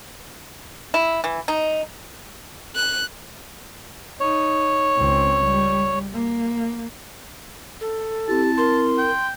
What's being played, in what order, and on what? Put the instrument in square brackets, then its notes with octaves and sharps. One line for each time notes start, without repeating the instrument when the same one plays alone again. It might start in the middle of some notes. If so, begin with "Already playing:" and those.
[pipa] E4
E3
D#4
[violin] F#6
[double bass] D#4 [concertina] C#5
[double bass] C#2 C4
G3
A#3
[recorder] A4
[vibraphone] C4 E4 [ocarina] G4 [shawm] A5
[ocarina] A#4 [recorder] C6
[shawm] G5